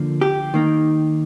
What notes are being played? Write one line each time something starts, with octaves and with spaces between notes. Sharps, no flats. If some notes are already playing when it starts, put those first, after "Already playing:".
Already playing: D3 F3 A#3
G4
D#3 A#3 D#4